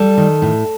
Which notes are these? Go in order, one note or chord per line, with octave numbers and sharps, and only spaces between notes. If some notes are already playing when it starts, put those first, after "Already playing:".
Already playing: G3 A4
D#3
A2